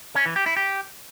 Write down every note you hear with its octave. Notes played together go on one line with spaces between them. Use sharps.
C#4
E3
G4
E4
G4